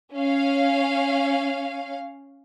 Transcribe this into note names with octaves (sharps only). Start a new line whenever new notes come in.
C#4 F5